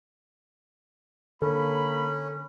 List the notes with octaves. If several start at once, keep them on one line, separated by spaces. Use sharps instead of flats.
D3 A#3 C#4 A4 B5